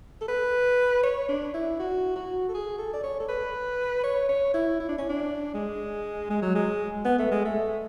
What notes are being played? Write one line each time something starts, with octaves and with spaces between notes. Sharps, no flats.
A4
B4
C#5
D4
E4
F#4
F#4
A4
G#4
A4
D5
C#5
A4
B4
C#5
C#5
E4
E4
D4
C#4
D4
G#3
G#3
F#3
G#3
B3
A3
G#3
A3